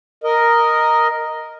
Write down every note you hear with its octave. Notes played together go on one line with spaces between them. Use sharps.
A#4 D#5